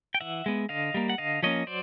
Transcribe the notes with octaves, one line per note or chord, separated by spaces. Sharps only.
G5
E3 E5 F#5
G#3 B3
D3 D#5 F5
G3 A#3
F#5
D3 D#5 F5
F3 A#3 C#4 C#5 D#5
F#3 C5 D5